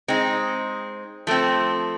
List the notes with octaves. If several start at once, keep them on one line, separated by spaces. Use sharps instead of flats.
G#3 C4 D#4
F3 A3 C4